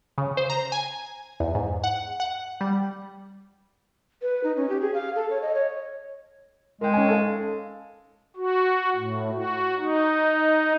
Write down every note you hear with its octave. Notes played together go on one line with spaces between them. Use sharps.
C#3
C5
A#5
G#5
E2
G#2
F#5
F#5
G3
B4
D#4
C#4
G4
G#4
F5
A4
C#5
D#5
C#5
G#3 A#4 G5
C#4 G#5
A4 F5
F#4
A2
F#4
D#4